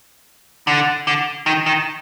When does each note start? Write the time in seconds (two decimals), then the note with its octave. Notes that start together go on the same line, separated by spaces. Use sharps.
0.67 D3
1.07 D3
1.46 D#3
1.66 D#3